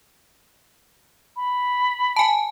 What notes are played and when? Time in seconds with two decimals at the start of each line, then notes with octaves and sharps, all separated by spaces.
1.37 B5
2.16 G#5 A5